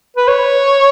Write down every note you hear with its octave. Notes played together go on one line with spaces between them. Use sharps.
B4
C#5